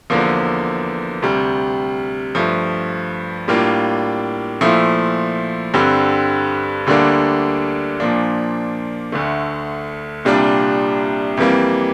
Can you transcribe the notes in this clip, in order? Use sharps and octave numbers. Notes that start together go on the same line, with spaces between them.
E2 D3 F3 A#3
D2 C3 G3
G2 F3 A3
A2 G3 A#3 D4 F4
A#2 F3 A3 E4
G2 D3 G3 C4
D2 D3 G3 A#3 D4
A#2 F3 A#3 D4
D2 D3 A3
C2 A#2 G3 D4 F4
F2 E3 G3 A#3